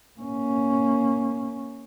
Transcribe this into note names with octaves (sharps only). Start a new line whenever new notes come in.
A#3 C#4